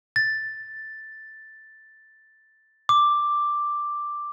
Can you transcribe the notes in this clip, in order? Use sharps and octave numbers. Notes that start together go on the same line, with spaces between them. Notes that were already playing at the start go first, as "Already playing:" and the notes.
A6
D6